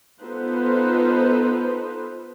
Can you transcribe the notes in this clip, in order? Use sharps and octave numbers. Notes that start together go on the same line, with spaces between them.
B3 D#4 F4 A4 B4 C5